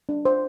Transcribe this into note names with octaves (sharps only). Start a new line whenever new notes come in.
D4
C5